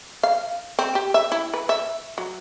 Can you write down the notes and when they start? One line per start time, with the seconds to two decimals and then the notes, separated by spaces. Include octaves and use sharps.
0.23 F5
0.79 C4
0.95 G4
1.14 E5
1.32 E4
1.54 B4
1.69 E5
2.18 F#3